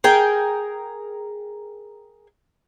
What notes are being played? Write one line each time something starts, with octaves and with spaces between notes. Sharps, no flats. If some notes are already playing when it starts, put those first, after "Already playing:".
G#4 A#4 G5